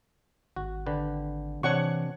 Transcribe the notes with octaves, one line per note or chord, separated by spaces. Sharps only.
G#1 F#4
D3 G4 B4
C3 E3 D4 C#5 F#5 C#6